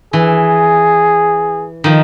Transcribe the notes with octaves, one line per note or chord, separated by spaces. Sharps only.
E3 G#4
D#3 F3